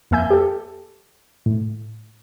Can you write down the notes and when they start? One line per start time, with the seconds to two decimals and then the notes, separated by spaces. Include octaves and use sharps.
0.11 F2 A#3 E5 G#5 G6
0.30 G4 A4
1.46 A2